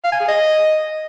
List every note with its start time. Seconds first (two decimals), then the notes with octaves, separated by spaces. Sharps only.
0.04 F5
0.12 G#5
0.20 G#4
0.28 D#5